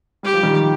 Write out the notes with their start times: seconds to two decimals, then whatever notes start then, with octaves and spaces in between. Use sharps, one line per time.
0.23 G3 G4
0.34 F3
0.43 D#3 G3